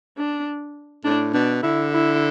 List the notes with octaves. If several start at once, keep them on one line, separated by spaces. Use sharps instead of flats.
D4
A2 D4
B2 D4
D3 E4
E4